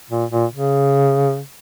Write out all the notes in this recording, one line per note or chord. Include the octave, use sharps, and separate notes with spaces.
A#2
A#2
C#3